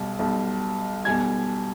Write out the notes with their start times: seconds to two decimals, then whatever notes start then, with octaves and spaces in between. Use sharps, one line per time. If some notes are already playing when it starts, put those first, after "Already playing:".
Already playing: B1 B2 G3
0.19 B1 B2 G3
1.05 B1 B2 G3 G#5 G#6